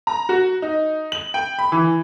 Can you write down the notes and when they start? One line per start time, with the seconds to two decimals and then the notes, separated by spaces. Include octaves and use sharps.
0.07 A#5
0.29 F#4
0.62 D#4
1.12 F#7
1.34 G5
1.59 B5
1.72 E3